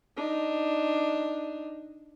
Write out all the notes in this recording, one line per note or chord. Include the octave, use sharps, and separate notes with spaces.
D4 D#4